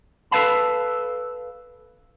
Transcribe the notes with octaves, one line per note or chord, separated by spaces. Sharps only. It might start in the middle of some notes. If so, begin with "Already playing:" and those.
A4 B4 C#5 F5 A5 B5